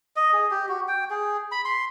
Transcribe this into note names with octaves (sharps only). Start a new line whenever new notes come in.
D#5
G#4
G4
F#4
G5
G#4
B5
C6